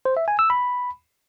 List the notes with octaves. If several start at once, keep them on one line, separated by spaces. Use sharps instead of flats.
C5
E5
G#5
E6
B5